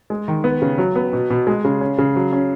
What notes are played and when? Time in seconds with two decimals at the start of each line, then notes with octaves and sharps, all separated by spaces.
0.10 G#3
0.28 D#3
0.44 B3
0.62 C#3
0.78 F#3
0.96 B3
1.13 B2
1.30 B2
1.47 G#3
1.65 C#3
1.81 C#4
1.98 C#3
2.16 F#3
2.33 C#4